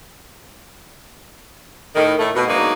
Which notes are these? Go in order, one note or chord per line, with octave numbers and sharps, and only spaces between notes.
A2 D#3
A2 A3
B2
G#2 F#3 A#3 D4 D#4